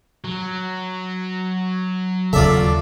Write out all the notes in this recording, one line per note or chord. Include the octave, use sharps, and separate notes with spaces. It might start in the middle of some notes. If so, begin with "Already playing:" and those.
F#3
D#2 C#3 F4 A4 D5 E5